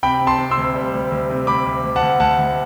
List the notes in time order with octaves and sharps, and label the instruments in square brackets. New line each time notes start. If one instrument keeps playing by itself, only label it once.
[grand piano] C3 G5 B5
C3
A5 C6
C3
C6 E6
D2
G3
D2
D2
C3
D2 B5 D6
D2
D2
F#5 A5
D2
D2 F#5 A5
D2